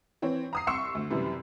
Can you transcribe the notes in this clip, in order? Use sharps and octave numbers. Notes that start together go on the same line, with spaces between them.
E3 C4 C#5
A#5 D#6 C7
C2 C6 C#6 E6 C#7 E7
D2
F#2 C3 E3 G3